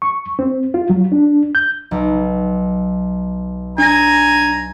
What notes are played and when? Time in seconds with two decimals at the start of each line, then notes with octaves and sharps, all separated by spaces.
0.02 C#6
0.39 C4
0.74 F4
0.90 F#3
1.12 D4
1.55 G6
1.91 B1
3.78 D4 G#5 A#5 A#6